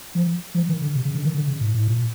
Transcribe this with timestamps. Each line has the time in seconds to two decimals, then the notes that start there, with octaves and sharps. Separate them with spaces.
0.15 F3
0.55 F3
0.69 D#3
0.81 D3
0.95 C3
1.05 C#3
1.15 D3
1.25 D#3
1.35 D3
1.48 C#3
1.61 A2
1.74 A2
1.88 A#2